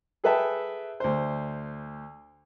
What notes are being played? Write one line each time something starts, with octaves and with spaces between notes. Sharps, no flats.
G#4 A4 B4 E5 G5 A5
D2 C5